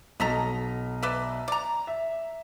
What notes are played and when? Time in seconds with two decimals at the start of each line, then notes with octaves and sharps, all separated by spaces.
0.20 B1 F#3 A4 D#5 A#5 B6
1.03 B4 D5 E5
1.48 D5 A#5
1.87 E5